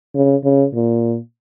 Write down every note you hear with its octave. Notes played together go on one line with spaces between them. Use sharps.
C#3
C#3
A#2